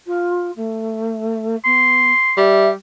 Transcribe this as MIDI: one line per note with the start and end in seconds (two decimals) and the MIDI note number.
0.06 0.51 65
0.56 1.56 57
1.65 2.12 59
1.65 2.36 84
2.37 2.72 55
2.37 2.68 76